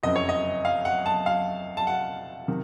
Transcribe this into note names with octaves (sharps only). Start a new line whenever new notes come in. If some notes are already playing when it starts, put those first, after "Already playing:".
F#1 F2 C#3 D#5
C#5
D#5
F5
F#5
A5
F5
A5
F#5
C3 D#3